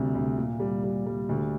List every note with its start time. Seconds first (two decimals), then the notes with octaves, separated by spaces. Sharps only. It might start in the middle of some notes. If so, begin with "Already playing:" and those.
Already playing: D2 C3 G3
0.15 D2
0.37 A#2
0.60 G3
0.84 G3
1.06 G3
1.29 D2